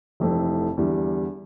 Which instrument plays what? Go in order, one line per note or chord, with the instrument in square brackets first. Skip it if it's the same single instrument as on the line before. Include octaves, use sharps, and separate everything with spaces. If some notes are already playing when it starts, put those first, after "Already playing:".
[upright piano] F1 F2 E3 A3 E4
E2 D3 G3